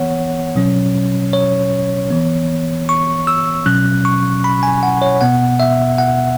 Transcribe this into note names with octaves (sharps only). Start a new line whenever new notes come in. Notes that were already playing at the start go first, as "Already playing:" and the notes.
Already playing: E3 B3 C#5 F#5
B2 F#3 C#4
C#5
E3 B3
C#6
E6
B2 F#3 C#4 F#6
C#6
B5
G#5
F#5
C#5
B2 B3 F#5
E5
F#5